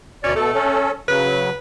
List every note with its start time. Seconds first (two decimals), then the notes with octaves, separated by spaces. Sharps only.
0.24 D2 B2 C#4 D5
0.36 B2 A3 A4
0.54 C#4 A4
1.08 C#3 F#3 B4